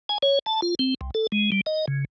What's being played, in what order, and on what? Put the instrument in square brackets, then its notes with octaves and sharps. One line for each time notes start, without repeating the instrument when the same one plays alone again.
[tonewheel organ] G#5
C#5
A5
F4
C4
C2
A4
G#3
G3
D#5
C#3